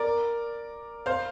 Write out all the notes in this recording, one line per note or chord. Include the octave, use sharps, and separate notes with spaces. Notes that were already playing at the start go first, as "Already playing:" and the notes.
Already playing: A#4 D5
C5 F5